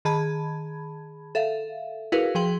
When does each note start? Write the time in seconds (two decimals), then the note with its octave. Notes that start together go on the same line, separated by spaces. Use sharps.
0.05 D#3 G#4 A5 B5 G#6
1.35 A4 E5 F5
2.12 E4 F#4 G#4 A#4 B4 F5
2.35 F3 G#4 G5 C6 F#7